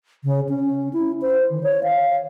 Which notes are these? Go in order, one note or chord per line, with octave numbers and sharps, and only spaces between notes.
C#3
C#4
E4
C5
D#3
C#5
F5